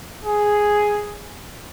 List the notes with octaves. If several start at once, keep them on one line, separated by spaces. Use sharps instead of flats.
G#4